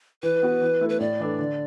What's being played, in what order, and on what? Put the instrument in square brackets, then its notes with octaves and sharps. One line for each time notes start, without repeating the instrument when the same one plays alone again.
[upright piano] E3 [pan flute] B4
[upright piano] B3 F#4
E3
A3 E4 A4
[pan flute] B4
[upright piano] A2 [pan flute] D5
[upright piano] E3 D4 A4
D3